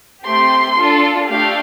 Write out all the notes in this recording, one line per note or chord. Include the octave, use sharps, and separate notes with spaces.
A3 C4 G4 C6
D4 F4 A4
A3 D4 G4 F5